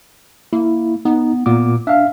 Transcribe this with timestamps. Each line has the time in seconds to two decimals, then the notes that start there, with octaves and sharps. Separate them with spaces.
0.53 A#3 E4
1.05 B3 D#4
1.46 A#2 B3 D6
1.87 D4 E5 F5